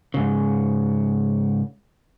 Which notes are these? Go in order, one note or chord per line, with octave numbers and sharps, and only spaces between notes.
G#2 C#3